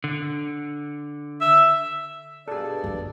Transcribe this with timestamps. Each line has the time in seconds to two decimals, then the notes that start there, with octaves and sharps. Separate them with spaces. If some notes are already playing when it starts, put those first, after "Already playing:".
0.04 D3
1.41 E5
2.48 G2 B2 G#4 A4 D5
2.84 G1 F2